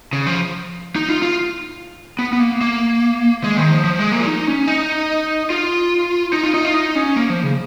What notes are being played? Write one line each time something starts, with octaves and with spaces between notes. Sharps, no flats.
C#3
F3
D#4
F4
F4
B3
B3
A#3
A#3
G#3
D#3
F3
F3
G#3
A#3
F4
D#4
C#4
D#4
F4
D#4
F4
D#4
F4
D#4
C#4
A#3
F3
C#3